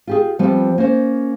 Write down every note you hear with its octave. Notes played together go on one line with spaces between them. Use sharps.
F4 G4 G#4
F3 G3 B3 C4 F4 G4
A#3 C#4 C5